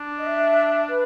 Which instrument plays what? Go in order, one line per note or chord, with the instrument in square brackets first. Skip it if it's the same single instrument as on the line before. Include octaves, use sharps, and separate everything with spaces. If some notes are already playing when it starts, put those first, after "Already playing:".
Already playing: [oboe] D4
[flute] D#5
E5
B4